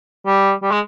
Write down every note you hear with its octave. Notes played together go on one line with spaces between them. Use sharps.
G3
G3
G#3